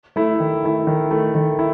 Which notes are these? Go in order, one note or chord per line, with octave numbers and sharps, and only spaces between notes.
A3 E4
D#3
A3 E4
D#3
A3 E4
D#3
E4